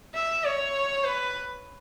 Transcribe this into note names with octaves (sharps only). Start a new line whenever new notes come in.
E5
C#5
B4